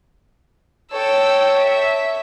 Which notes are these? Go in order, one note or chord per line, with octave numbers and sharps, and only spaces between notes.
A4 C#5 G5 E6
E5